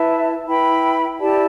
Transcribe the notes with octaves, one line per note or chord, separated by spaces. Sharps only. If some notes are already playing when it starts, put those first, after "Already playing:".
Already playing: E4 B4 E5 A5
E4 B4 G5 B5
E4 G4 D5 A5